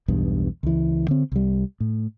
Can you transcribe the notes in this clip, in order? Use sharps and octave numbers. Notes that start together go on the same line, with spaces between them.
B1 E2 G2 B2
C#2 E3
D3 C4
C2 G3
A2